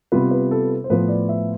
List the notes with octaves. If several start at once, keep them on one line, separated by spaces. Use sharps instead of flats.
C3 G3 B3 F4 B4
B4
A4
C5
A2 F3 B3 B4
D5
E5